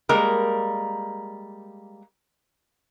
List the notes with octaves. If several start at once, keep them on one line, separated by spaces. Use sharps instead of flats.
G3 G#3 A#3 A#4